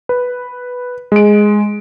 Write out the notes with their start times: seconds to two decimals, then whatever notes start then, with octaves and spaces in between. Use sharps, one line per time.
0.09 B4
1.12 G#3 D7